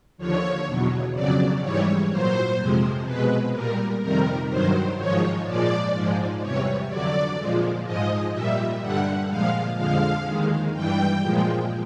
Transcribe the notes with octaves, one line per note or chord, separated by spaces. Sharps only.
D#2 D3 F3 C#5
E2 B2 F#3
F2 C#3 F#3 D5
G#2 E3 G3 C#5
A#2 F#3 C5
F2 C3 F3 G#3
B2 G#3 B4
A#2 G3 A#4
F2 C3 D#3 G3 A#4
G2 D#3 F#3 C5
G#2 F3 G#3 C#5
A#2 F3 G#3 D5
G#2 F3 G#3
E2 C3 E3 G3 C#5
F2 D3 F#3 D5
A#2 F3 G#3
G#2 F3 G#3 D#5
A#2 G3 E5
G2 D3 G3 F#5
A#2 F3 G#3 F5
F2 D3 F3 G#3 F5
D#2 D#3 G#3
G2 E3 G3 G5
A#2 F3 G#3